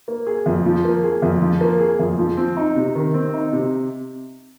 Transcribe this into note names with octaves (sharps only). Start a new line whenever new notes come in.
A#3
G#4
F2
F3
A#3
G#4
F2
F3
A#3
G#4
F2
F3
C4
D#4
C3
D#3
C4
D#4
C3